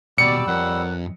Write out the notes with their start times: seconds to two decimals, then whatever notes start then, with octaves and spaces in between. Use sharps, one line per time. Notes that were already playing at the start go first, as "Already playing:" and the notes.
0.18 D#2 B2 G3 F#4 G4 D5 E6 C#7
0.47 F2 A#4 C#5 F#5